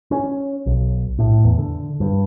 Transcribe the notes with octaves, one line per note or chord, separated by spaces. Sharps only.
C#4
B1
A2
E2
D3
G2